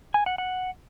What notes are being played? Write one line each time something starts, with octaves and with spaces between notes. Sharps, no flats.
G#5
F#5
F#5